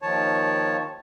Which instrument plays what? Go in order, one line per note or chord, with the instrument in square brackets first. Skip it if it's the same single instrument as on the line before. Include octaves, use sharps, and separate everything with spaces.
[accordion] D#2 D#3 F3 C#5 A5